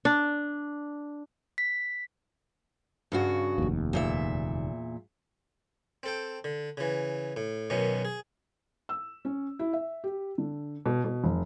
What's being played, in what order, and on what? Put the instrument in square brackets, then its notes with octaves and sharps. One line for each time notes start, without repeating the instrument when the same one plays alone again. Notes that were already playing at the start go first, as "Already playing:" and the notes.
[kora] D4
[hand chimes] B6
[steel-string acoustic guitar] G2 C#3 F#4
[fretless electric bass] F1 D#2
[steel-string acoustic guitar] E2 A#2 E5
[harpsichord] C4 A4 G5
D3
C#3 E3
A2
F#2 B2 D#3 C#4
G#4
[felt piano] E6
C#4
E4
E5
G4
D3
B2
B2
F1